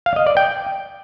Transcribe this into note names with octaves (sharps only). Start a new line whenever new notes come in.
F5
D#5
D5
G5